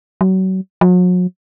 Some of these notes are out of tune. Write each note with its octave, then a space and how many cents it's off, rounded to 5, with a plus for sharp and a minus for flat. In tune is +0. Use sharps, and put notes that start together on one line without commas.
F#3 +30
F#3 -40